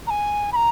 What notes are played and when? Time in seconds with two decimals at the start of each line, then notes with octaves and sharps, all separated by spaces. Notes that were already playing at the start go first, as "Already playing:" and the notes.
0.07 A#5
0.10 G#5
0.53 B5
0.56 A#5